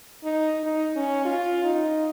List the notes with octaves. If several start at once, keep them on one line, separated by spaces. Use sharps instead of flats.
D#4
D#4
C#4
F4
D#4